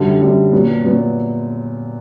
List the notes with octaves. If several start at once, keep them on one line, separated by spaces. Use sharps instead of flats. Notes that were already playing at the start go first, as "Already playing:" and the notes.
Already playing: F#2 D3 G3
F#2 D3 G3
A#2 F#3 B3
A#2 F#3 B3